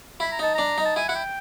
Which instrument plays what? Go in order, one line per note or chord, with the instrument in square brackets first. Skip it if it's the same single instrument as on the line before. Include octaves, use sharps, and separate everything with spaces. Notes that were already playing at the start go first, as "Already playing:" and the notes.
[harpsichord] E4 [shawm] B5
[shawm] A#5
[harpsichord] D#4 [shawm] A5
[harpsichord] D4 [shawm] A#5
[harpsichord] D#4
[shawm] A5
[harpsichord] E4 [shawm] G#5
[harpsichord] E4 [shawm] F#5
[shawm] G5